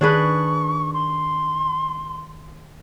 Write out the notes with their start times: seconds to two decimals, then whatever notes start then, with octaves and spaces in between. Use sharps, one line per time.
0.01 D#3 D4 G#4 B4 C#6
0.94 C6